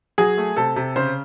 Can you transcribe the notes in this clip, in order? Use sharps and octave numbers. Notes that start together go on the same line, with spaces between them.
F#3 G#4
A3
C3 A4
C3
C#3 C5